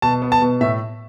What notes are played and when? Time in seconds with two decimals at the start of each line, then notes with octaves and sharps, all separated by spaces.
0.02 B2 A5
0.22 B3
0.32 A5
0.42 B2
0.61 A2 E5